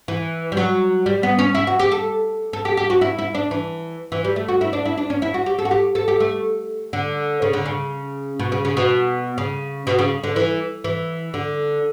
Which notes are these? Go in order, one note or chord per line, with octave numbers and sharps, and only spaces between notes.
E3
G3
F#3
G3
B3
C#4
E4
F#4
G4
A4
A4
G4
G4
F#4
E4
E4
D4
E3
E3
G3
A3
F#4
E4
D4
E4
D4
C#4
E4
F#4
G4
A4
F#4
G4
A4
G4
A3
D3
C#3
D3
C#3
B2
C#3
C#3
B2
C#3
B2
C#3
D3
E3
E3
D3